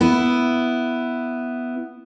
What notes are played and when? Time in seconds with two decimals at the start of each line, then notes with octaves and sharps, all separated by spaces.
0.01 B3 E4